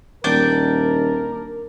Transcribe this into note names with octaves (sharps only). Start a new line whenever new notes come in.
D#1 D4 A#4 G5